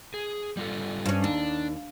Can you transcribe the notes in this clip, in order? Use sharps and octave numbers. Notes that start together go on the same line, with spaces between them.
G#4
G3 F4 A4
G2 C#4
D#2 D4